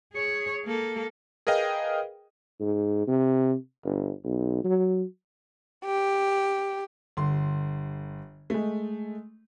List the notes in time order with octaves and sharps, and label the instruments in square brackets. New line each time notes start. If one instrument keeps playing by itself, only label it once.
[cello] G#4 C#5
A#3 A4
[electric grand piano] G#4 A#4 B4 D#5 F5 G5
[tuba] G#2
C3
G1
B1
F#3
[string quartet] G4
[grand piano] G1 C6
G#3 A3